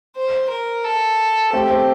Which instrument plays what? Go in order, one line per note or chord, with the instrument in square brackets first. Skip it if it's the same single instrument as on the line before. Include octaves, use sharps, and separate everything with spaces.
[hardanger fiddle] C5
A#4
A4
[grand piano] A3 C4 [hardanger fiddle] G4
[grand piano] A3 C4